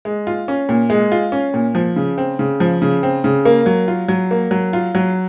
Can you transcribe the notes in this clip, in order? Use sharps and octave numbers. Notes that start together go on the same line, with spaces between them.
G#3
F4
C#4
A#2
G#3
F4
C#4
A#2
F3
C#3
C4
C#3
F3
C#3
C4
C#3
A#3
F#3
F4
F#3
A#3
F#3
F4
F#3